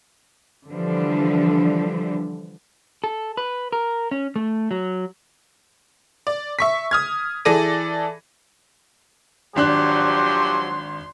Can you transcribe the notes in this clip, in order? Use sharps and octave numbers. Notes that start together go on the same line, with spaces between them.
D3 E3 F3 G3 D4
A4
B4
A#4
C#4
A3
F#3
D5
E5 C#6 B6
D#6 F6 G#6
E3 G#4 A4 D5 A#6 D#7
G#1 F3 F#3 D4 G4 C6 F#6